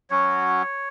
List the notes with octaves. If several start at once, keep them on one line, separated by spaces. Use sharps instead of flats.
F#3 C#4 F#4 C#5